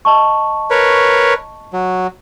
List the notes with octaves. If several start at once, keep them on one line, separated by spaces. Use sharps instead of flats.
D#5 A5 C#6
A#4 B4 C#5
F#3